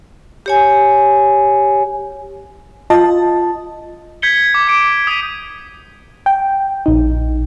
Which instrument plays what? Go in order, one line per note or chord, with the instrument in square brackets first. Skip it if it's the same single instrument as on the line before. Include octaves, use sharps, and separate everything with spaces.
[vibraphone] G4 C#5 G#5
[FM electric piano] F4 D#5 A5
[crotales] G6 G#6 B6 C#7 G7
D6
D6 C#7 D7
D#6 G#6 B6 D#7
[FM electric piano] G5
A#1 D#4